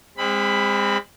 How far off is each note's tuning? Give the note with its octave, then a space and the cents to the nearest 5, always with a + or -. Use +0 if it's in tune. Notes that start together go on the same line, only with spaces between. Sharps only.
G#3 -35 C4 +0 B5 +10